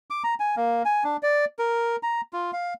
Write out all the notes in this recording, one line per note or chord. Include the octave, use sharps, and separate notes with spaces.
D6
A#5
G#5
A#3
G#5
D4
D5
A#4
A#5
F4
F5